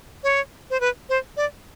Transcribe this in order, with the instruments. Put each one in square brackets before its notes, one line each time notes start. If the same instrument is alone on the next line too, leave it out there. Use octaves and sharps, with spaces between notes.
[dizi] C#5
C5
B4
C5
D5